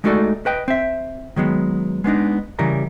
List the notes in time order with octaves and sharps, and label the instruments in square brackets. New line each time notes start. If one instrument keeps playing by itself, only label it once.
[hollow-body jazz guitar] G#3 A3 D#4 F#4 A4 D5
B4 D#5 G5
C4 E5
D#3 F#3 G#3 B3
G#3 B3 D4 D#4
C#3 E3 G3 A#4 A#5